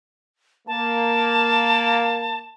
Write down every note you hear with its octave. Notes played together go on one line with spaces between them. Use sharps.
A#3 A5